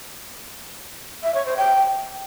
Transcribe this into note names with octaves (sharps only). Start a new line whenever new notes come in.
E5
C#5
C5
G5